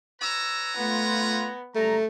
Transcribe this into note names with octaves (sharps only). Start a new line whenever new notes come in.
B4 C#5 A#5 E6
A3 B3 F4
F#1 G3 A3 A#5